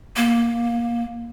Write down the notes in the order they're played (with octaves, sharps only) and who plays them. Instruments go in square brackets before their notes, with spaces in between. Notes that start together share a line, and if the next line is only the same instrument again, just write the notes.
[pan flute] A#3